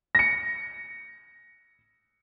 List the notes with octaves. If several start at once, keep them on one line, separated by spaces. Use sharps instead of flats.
A#6 C#7